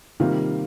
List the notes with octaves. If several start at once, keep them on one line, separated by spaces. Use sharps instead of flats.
C3 D#3 G3 A#3 F4